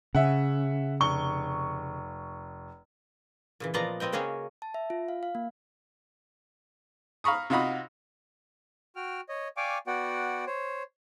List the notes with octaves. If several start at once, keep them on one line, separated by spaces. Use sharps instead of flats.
C#3 C#4 E5 F#5
F1 C#6 G7
A#2 C#3 E3
A#2 F3 B3 D5 D#5 A#5
B3 C4 D#5 G5
C#3 A#3 C#4 F#4 G#4 C#5
A5
E5
F4
F5
F5
A#3
F5 A#5 B5 C#6 D#6
C3 D#4 F4 F#4 B5 D#6
F#4 G5 F6
C#5 D#5
D5 F5 G5 G#5 C#6 D6
B3 F#4 D5 F#5 G5
C5 C#5